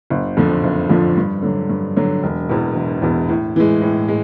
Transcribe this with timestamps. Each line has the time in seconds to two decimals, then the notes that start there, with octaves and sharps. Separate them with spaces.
0.10 F#1
0.37 F2 D3 F3
0.64 F#1
0.90 F2 D3 F3
1.17 G2
1.42 D3 F#3
1.69 G2
1.96 D3 F#3
2.23 E1
2.49 E2 B2
2.76 E1
3.02 E2 B2
3.29 A2
3.56 E3 G#3
3.82 A2
4.08 G#3